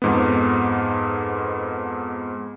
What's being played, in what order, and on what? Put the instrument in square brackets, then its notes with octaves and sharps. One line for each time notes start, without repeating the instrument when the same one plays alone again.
[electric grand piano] F2 G#2 B3